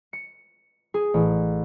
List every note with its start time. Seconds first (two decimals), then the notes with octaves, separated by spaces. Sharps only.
0.13 C#7
0.94 G#4
1.14 A1